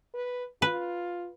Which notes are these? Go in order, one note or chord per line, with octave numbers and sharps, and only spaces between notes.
B4
F4 B4